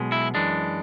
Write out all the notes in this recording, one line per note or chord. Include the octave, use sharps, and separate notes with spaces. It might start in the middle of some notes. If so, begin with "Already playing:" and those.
Already playing: B1 B2 G#3
E4
F#2 E3 G#3 D4